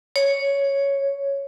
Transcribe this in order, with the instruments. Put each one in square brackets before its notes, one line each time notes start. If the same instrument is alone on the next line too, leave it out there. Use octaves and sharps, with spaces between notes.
[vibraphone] C#5